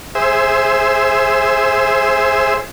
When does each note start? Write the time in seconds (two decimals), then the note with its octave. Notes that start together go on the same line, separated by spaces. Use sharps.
0.15 G#4 C5 E5